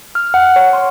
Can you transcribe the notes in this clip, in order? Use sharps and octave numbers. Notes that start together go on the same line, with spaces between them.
F6
F#5
C#5
C6